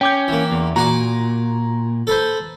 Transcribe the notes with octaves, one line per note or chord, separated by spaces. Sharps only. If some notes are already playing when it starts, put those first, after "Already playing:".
C#4 G5 D6 G6
E3 A#3
E2
A#2 F#4 G#5 A#5 D6
A4 B4 C5